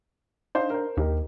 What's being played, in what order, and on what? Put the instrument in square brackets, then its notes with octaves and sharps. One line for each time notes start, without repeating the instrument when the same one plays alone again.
[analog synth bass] D4 [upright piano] D#4 C5 F5
[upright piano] A#4 C5
[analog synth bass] D#2 [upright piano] D#4 G4 A#4